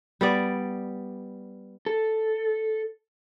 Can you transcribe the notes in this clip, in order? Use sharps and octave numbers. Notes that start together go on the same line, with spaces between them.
G3 B3 D5
A4